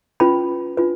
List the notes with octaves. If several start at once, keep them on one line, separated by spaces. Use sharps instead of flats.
C#4 F4 B4 B5
D4 F4 B4